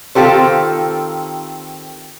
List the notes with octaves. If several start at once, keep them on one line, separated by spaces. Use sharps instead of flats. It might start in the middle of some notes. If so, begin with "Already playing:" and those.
D#3 C4 F4 G4 A4 C5